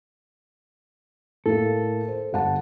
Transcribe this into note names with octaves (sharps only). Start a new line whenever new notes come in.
A2 A#3 A4
C5
G1 F#5 A5